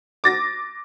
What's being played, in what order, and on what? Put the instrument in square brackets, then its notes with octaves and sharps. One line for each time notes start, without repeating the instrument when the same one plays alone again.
[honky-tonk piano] D6 A6 A#6